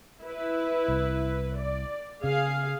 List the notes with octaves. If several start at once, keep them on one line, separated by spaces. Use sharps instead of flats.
E4 B4
C2
D5
C#3 G#4 F5